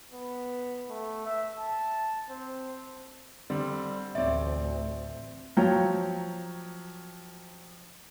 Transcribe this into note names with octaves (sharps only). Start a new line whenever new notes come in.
B3
A3
E5
A5
C4
D3 G3 C4
A1 D2 C4 C#5 D5 E5
F3 F#3 C#5 G5 A#5